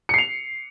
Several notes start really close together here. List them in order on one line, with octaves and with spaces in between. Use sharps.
C#7 C7 F7